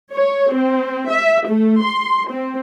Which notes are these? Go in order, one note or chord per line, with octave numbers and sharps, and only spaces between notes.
C#5
C4
E5
A3
C6
C4